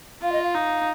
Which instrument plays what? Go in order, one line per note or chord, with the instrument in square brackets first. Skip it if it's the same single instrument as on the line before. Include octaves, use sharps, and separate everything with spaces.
[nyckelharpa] F4 [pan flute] F5
[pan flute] D#5
F5
[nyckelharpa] D#4